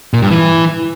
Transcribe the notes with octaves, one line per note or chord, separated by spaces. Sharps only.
A#2
G2
E3